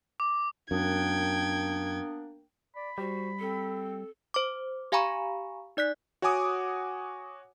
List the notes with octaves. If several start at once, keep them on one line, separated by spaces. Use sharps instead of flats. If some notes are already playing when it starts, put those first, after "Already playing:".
D6
F#2 A#3 B3 D4 G5 G#6
D5 B5
G3 F#4 C5
C4 A4
C5 D6
G4 F5 G#5 A#5 B5 C#6
D#4 D5 F#6 B6
F#4 C#5 F#5 G#5 D6 D#6